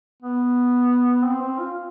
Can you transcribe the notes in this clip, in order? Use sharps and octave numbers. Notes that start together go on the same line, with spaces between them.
B3
C4
C4
F4